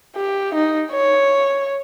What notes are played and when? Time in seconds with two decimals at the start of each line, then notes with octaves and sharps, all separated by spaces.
0.16 G4
0.55 D#4
0.91 C#5